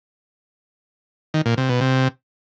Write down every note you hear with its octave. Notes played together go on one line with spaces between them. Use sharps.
D#3
A#2
C3
B2
C3